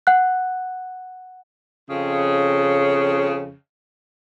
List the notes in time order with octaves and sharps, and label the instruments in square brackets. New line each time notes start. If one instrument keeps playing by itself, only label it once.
[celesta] F#5 F#6
[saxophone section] F2 C#3